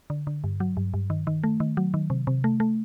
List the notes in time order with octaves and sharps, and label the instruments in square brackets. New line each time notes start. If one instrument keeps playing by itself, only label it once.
[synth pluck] D3
D3
G2
F#3
G2
G2
D#3
D#3
A3
D#3
F#3
D#3
C3
C3
A3
A3